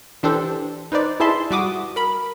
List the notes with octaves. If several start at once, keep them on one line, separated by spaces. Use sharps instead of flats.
E3 D4 G4 A4 C5
D#4 B4 C5 D5
E4 G#4 E5 A5 C6
G3 F#4 D6 D#6
A#4 B5